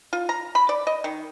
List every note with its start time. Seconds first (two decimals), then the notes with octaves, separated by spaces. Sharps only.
0.13 F4
0.29 A#5
0.55 B5
0.69 D5
0.87 D#5
1.04 D#3